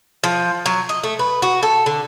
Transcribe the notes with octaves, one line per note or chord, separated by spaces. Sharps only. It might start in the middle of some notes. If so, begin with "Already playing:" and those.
F3
F#3
D#5
A3
B4
F#4
A4
D3